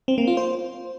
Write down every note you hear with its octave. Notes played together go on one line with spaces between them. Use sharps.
C4
A#3
F4
C5